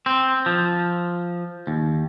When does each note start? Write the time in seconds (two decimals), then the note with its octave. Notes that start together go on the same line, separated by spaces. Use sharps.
0.06 C4
0.46 F3
1.67 D#2